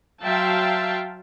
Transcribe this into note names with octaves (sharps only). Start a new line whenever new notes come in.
F#3 E5 F5 G5 A5 C6